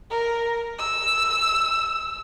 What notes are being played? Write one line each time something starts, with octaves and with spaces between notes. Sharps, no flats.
A#4
E6